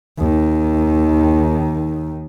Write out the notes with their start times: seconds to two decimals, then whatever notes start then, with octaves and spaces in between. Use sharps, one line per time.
0.18 D#2 D#3